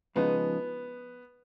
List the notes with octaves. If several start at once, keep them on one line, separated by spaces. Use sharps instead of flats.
C#2 C#3 F3 G#3 B3 D#4